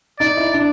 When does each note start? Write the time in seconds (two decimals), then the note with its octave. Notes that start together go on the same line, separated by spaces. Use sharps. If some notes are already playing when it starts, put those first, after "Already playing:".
0.20 D#4 D5
0.37 E4
0.54 D4